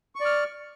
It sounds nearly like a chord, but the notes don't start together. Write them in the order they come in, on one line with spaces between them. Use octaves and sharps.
C#6 D5 F6